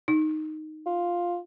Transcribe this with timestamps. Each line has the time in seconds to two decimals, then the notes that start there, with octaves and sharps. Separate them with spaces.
0.08 D#4
0.86 F4